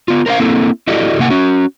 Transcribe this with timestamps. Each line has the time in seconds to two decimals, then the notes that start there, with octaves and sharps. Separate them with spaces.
0.08 B3 F4
0.26 A#4 C5 D#5 F5
0.39 A#3 C4 E4 A4
0.87 E4 F#4 G4 A4 D5 D#5
1.19 C3 A#3 F#5 G#5
1.30 C#4 F#4